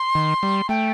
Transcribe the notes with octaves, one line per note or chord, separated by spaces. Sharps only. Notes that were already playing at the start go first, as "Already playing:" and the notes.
Already playing: C6
D#3
G3
A3 G5